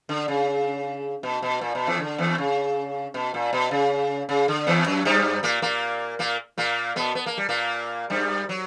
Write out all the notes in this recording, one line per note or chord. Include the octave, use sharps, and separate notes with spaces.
D3
C#3
B2
B2
A#2
B2
E2 E3
D3
E2 E3
C#3
B2
A#2
B2
C#3
C#3
D3
E2 E3
F#2 F#3
G2 G3
A#2 A#3
A#2 A#3
A#2 A#3
A#2 A#3
B2 B3
B3
A#3
G3
A#2 A#3
G2 G3
F#3